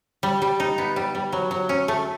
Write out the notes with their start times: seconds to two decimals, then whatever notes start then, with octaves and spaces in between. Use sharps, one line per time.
0.23 G3
0.42 G3
0.60 D#4
0.78 B3
0.96 G3
1.15 G3
1.33 F#3
1.51 F#3
1.69 C#4
1.88 A3